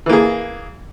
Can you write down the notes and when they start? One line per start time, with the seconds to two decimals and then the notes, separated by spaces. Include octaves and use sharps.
0.06 E3
0.09 A#3
0.13 G#4